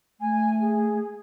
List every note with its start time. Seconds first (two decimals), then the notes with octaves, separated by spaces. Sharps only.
0.20 A3 G#5
0.60 G#4